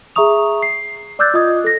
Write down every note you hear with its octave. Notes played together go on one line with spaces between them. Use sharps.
G#4 E5 A#5 C#6 D#6 F7
C7
D5 D6 E6 F#6 G6 A6
F4 D#5 D#6 G#6
A4 A#6